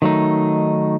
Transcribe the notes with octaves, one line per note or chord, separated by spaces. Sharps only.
D#3 F#3 A3 D#4